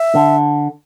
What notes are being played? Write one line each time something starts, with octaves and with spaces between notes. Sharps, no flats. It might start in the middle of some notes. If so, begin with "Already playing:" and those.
Already playing: E5
D3